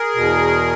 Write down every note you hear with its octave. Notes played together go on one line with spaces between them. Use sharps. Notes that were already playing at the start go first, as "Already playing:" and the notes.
Already playing: G#4 A#4
E2 B2